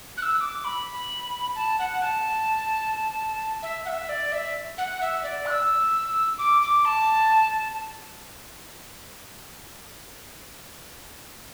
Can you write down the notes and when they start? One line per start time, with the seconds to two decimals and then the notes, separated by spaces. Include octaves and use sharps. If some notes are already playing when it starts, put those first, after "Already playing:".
0.17 F#6
0.22 E6
0.41 D6
0.65 B5
1.56 A5
1.79 F#5
2.02 A5
3.63 E5
3.85 F#5
3.89 E5
4.09 D5
4.32 E5
4.78 F#5
5.01 E5
5.24 D5
5.46 F#6
5.51 E6
6.38 D6
6.62 D6
6.85 A5